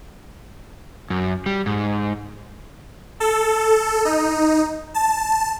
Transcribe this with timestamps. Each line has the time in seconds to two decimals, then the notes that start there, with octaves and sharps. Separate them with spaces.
1.10 F#2
1.46 G3
1.66 G#2
3.20 A4
4.05 D#4
4.94 A5